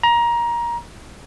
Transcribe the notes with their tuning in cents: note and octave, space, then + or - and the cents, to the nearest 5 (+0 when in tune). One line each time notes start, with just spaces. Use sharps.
A#5 +20